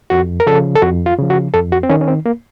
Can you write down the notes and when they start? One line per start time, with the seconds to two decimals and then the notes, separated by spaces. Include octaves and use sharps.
0.10 F2 F#4
0.40 A#4
0.47 C#3 F3 A4
0.75 A4
0.82 F2 F#4
1.06 F4
1.19 C#3 F3
1.30 F#4
1.54 F2 A4
1.72 F#4
1.83 C4
1.90 D#3 C#4
2.01 C#4
2.08 C4
2.26 A#3